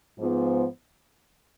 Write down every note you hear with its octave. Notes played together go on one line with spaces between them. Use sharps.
G#2 F3 B3